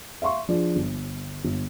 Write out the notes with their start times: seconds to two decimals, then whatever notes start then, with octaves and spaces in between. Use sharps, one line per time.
0.22 E5 F5 C6 C#6
0.49 F3 D4 G#4 D5
0.76 G1
1.44 G1